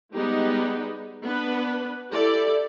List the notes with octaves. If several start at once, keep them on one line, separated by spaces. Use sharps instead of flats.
G3 G#3 B3 D#4 G4
B3 D4 B4
E4 G4 A4 D5